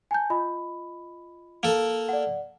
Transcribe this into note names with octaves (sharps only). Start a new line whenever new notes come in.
G#5 A5 G6
F4 D#5 B5
A#3 A4
D5 F#5